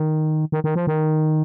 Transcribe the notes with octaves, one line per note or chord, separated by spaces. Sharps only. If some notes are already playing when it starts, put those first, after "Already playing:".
Already playing: D#3
D#3
D#3
F3
D#3